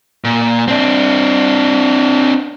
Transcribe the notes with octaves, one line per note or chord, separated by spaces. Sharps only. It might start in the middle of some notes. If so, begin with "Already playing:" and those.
A#2
C4 D4